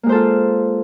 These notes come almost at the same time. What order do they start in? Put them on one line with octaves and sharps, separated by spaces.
A#3 G#3 C5 A4 F4